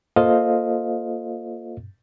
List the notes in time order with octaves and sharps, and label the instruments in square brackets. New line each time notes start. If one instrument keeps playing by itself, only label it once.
[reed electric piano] A#3 F4 A4 C5 D#5 F5